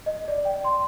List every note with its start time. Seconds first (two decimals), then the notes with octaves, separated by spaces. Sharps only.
0.06 D#5
0.28 D5
0.45 G5
0.64 C6